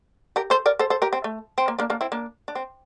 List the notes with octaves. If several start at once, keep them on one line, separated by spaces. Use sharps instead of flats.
G4 A#4
A4 C5
A#4 D5
A4 C5
A4 C5
G4 A#4
C4
A3
C4
A#3
A#3 D4
A#3 D4
C4 E4
A#3 D4
D4
C4